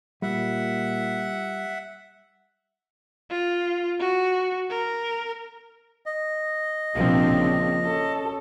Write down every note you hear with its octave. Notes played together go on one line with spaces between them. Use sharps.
A#2 G3 E5 F#5
F4
F#4
A#4
D#5
A#1 C3 F3 A#3 C4 D4
C#3
C#4 A4